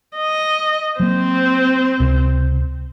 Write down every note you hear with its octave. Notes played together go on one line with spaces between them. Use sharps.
D#5
F#3 A#3 C4 C5
C#2 C3